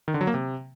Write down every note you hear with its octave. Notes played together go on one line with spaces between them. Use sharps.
D#3
D3
F#3
A#3
C3